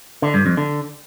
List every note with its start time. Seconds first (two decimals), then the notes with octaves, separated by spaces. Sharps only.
0.22 D3
0.34 G2
0.46 F2
0.57 D3